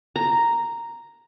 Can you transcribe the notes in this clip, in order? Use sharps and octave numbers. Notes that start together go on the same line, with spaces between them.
A#5